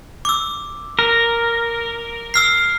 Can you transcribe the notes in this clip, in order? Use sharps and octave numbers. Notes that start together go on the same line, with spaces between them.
D6 E6
A#4
E6 F6 C7